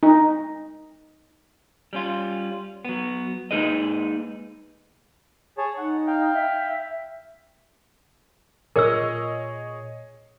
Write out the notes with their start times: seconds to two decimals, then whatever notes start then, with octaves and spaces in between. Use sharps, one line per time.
0.03 D#4
1.93 G3 C#4 F4
2.85 F#3 B3
3.51 G#3 A#3 D#4 G#4 B4 D#5
5.58 G#4 C#5 A5
5.78 D#4 F#5
6.07 F5 G5
6.33 E5
8.76 A#2 F4 G#4 A#4 C#5 D#5 E6